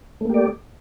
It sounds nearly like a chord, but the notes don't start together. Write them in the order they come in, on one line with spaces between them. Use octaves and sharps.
A3 A#3 G4 D5